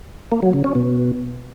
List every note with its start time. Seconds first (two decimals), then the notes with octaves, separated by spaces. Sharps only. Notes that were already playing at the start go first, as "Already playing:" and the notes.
0.32 A#3
0.42 F#3
0.53 C#3
0.64 C#4
0.75 B2